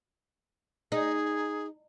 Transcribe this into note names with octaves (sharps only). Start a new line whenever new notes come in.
D#4 G#4